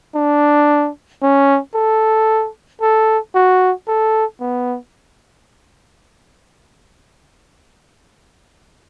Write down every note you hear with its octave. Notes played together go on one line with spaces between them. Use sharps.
D4
C#4
A4
A4
F#4
A4
B3